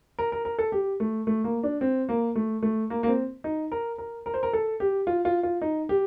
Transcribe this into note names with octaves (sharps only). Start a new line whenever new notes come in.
A#4
A#4
A#4
A4
G4
A3
A3
A#3
D4
C4
A#3
A3
A3
A#3
A#3
C4
D#4
A#4
A#4
A#4
C5
A#4
A4
G4
F4
F4
F4
D#4
G4